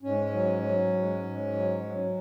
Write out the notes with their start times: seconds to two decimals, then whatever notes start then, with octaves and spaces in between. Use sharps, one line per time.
0.03 G#2 C#4
0.32 F#3
0.62 F#3
0.93 G#2
1.24 G#2
1.53 F#3
1.84 F#3